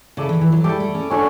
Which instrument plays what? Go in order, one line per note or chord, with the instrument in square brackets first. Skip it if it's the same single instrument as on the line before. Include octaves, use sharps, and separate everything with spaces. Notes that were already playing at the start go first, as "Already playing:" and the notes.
[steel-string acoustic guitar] C#3 [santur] E4 A4 D5
[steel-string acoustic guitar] E3
E3
F#3
[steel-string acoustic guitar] G3 [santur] E4 A4 D5
[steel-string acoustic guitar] A3
C#4
[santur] C#4 F#4 A4 C#5 [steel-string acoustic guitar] D4